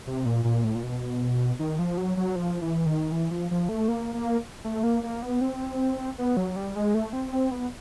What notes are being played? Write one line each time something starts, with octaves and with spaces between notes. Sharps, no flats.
C3
A#2
A#2
A2
A#2
B2
D#3
F3
F#3
F#3
F3
E3
D#3
E3
F3
F3
A3
A#3
A#3
A3
A#3
A#3
B3
C4
B3
F#3
G3
G#3
A3
C4
C4
B3